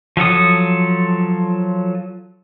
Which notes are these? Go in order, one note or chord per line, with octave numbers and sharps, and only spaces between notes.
F3 F#3 A4 D#6